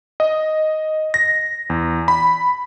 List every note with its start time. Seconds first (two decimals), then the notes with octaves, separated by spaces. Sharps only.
0.20 D#5
1.14 A#6
1.70 E2
2.08 B5